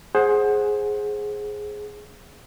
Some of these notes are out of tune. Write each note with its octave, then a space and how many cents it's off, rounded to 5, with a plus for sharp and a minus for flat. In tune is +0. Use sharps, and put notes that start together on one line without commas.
G#4 +5 C5 +20 F#5 +0